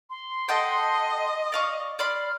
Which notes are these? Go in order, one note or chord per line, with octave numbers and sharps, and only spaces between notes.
C6
A4 D#5 F#5 G5
D5 F5 C#6
D5 B5 C6 F6